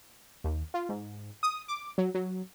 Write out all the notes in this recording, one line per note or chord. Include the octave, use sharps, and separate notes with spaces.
D#2
F4
G#2
D#6
D6
F#3
F#3